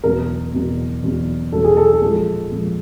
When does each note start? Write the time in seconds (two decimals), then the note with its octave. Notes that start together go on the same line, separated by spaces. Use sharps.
0.04 E2 B2 F#3 A#4
0.53 E2 B2 F#3
1.02 E2 B2 F#3
1.52 E2 B2 F#3 A4
1.64 G#4
1.77 A4
1.93 G#4
2.02 A#2 F3 G#3 A4
2.51 A#2 F3 G#3